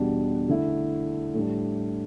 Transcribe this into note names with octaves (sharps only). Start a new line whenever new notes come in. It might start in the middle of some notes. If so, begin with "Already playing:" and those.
Already playing: E2 B2 G3 D4
D3 A3 E4
A2 G3 D4